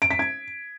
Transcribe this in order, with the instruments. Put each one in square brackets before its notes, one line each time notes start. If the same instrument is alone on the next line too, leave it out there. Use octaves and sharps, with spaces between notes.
[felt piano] D7
B6
G#6